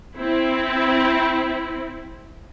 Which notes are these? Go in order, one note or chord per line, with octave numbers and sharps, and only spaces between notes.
C4 E4